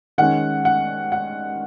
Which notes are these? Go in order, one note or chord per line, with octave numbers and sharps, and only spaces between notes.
D#3 G#3 C#4 F#5
F#5
F#5